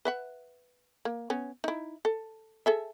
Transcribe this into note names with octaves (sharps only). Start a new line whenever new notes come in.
B4 E5 F#5
A#3
B3 C#4
D#4 E4
A4
G#4 A4 E5